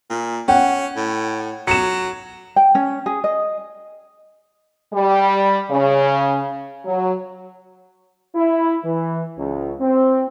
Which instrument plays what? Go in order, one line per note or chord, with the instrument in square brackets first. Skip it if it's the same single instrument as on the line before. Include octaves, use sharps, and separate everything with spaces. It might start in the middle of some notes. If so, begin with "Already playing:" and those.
[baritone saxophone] A#2
[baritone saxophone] C#4 [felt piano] F#5 G5
[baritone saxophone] A2
[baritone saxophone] F#3 [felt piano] C#7 E7
[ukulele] G5
C#4
G#4
D#5
[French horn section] G3
C#3
F#3
[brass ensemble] E4
E3
C#2
C4